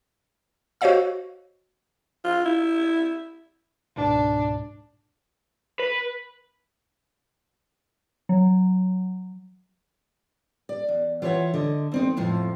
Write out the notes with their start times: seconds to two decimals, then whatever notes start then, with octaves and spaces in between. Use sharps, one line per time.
0.81 F#4 C5 C#5 D#5 F5 E6
2.24 F4
2.45 E4
3.96 C#2 G#2 B2 D4
5.79 B4
8.29 F#3
10.69 D5
10.89 E2
11.22 E3 F4 C#5 E5 F#5
11.54 D3 D#5
11.92 E2 C4 D#4
12.17 F2 A2 F3